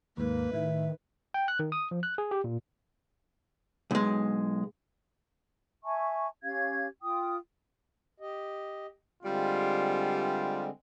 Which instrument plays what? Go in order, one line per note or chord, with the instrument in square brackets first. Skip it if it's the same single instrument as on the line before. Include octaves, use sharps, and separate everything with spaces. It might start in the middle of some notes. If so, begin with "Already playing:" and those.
[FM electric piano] D#2 G#2 [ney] A#3 [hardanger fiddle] B4
[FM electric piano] A2 [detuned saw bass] D#3 [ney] E5
[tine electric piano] G5
F#6
D#3
D#6
F3
F#6
G#4
G4
A#2
[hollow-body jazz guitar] B1 G#3
[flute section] E5 G#5 A5 C#6
C#4 G4 F5 G#6
F4 G5 D#6
[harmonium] G4 D#5
[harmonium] D3 G#3 C4 [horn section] G3 F4